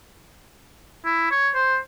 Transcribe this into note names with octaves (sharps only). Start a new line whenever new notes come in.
E4
C#5
C5